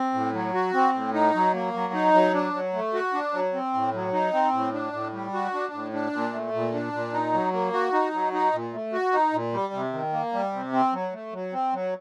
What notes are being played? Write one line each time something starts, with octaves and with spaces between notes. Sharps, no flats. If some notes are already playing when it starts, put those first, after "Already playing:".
Already playing: C4
A2
F#3
F#4
C4
A2
D#4
F#3
A#3
F#3
D#4
F#3
D4
F#3
A3
F#4
D4
F#3
C4
A2
F#3
D#4
C4
A2
D4
A2
G3
F#4
D4
A2
D4
A#2
A3
A#2
D4
A#2
D#4
F#3
A#3
F#4
D#4
F#3
D#4
A#2
A3
F#4
D#4
A#2
G3
C3
D#3
A#3
G3
C3
C4
F#3
A3
F#3
C4
F#3